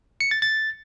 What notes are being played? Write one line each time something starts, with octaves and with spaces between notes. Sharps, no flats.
C#7
A6
A6